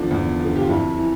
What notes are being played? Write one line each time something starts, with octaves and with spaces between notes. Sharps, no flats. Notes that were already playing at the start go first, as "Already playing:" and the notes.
Already playing: E2 D3 F3 D4
E2
D3 F3
G4
F4
F2 E4
E3